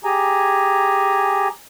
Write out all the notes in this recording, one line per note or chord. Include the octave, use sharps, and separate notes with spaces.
G4 G#4 G#5 A#5